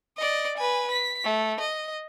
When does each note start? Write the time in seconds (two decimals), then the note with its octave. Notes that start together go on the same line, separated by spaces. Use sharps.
0.17 D5 D#5
0.57 B4 G#5
0.91 B6
1.24 A3
1.60 D#5